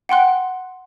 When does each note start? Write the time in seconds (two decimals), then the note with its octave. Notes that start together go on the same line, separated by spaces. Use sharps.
0.09 F#5 G5 C6 F#6